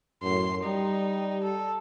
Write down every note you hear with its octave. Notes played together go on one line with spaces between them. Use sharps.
F#2 A2 C6
G3 D#4
A4